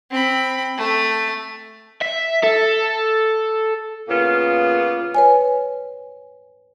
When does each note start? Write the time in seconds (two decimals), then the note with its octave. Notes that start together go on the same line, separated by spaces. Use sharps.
0.11 C4 B5
0.78 A3
2.02 E5
2.44 A4
4.08 A#2 C#3 A#3 B3 F4
5.15 B4 C#5 G#5